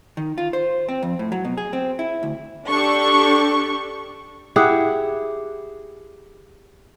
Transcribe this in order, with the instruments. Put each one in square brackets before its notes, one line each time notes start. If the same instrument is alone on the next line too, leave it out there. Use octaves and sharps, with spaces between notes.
[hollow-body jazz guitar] D#3
F4
C5
C4
F2
A2
F#3
B2
G#4
C4
E4
D2
[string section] D4 G4 A4 C#6
[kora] E4 G4 G#4 F#5